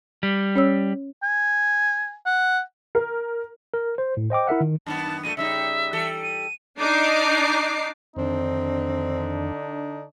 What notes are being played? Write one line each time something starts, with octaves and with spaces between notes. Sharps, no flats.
G3
C#4 C#5 E6
G#5
F#5
A#4
A#4
C5
A2
C5 D#5 G5 D6
E4 A#4 E5 F#5
D#3
F#2 D#3 B3 A5
F#2 A#2 A3 D#7
C#3 G3 D#4 E5
E3 G3 A4
D#7
D4 D#4 D6 C7
F2 D3 D#3 C4 D4 D#4